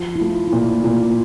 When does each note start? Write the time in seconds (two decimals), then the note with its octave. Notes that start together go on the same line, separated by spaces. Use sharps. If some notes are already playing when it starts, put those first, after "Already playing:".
Already playing: F3
0.16 E4
0.21 A3 F4
0.47 E4
0.52 A#2 F4
0.84 A#2 F4